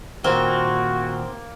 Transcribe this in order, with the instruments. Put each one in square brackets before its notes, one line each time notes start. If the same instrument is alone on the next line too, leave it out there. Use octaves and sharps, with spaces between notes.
[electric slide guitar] A#2 D#3 [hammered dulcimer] A#3 [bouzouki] C4 [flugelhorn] F#4